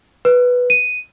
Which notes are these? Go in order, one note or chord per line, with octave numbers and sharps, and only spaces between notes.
B4
D#7